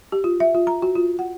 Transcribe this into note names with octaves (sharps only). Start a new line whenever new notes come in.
G4
F4
E5
F4
A#5
F#4
F4
F#5